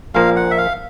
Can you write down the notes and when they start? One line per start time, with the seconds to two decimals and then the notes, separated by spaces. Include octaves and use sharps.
0.14 A#1 A#2 F3 A#3 F5
0.36 F#5
0.51 E5
0.58 F5